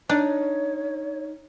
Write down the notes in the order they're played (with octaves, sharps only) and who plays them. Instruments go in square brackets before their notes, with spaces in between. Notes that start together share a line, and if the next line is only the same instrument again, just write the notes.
[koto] D4 [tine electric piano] D#4 [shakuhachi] C#5